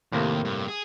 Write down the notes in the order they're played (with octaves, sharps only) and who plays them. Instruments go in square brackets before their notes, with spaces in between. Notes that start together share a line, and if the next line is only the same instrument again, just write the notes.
[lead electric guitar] D#2 [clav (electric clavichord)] A2 C3 A#3
[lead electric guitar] G2
G#4